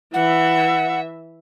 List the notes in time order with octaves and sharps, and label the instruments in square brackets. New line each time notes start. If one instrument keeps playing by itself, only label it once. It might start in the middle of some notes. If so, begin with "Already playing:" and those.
[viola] E3 E5 [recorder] F#5